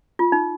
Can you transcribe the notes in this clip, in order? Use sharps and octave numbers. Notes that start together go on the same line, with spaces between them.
F4
D#4